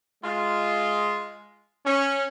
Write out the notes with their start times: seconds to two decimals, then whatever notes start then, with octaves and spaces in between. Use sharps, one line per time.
0.24 G#3 F4
1.86 C#4